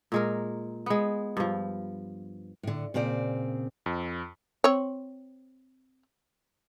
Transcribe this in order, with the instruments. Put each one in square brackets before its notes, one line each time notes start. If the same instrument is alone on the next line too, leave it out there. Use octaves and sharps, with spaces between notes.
[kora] A#2 G#3 A#4
G#3 B3
G2 F3
[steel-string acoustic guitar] A2 D3
A#2 C#3 C4 D5
[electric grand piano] F2
[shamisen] C4 C#5